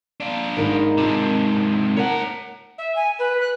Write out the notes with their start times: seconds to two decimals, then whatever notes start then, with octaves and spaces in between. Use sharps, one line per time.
0.20 D4 F4
0.57 G#1 D#4 A#4
0.98 G#2 C3 F4 A5
1.97 A#4 C#5 F#5 A5
2.78 E5
2.96 G#5
3.19 B4
3.41 F#6